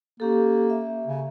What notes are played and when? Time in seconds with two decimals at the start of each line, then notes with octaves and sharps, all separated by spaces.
0.20 A#3 C#4 G4 A4
0.70 E5
1.07 C#3